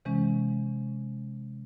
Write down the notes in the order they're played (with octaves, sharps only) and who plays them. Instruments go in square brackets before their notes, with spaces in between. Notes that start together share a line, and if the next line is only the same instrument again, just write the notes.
[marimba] C3 E3 G#3 C#4